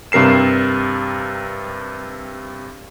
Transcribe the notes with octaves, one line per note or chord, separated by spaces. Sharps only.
G2 C3 A#4 C7 E7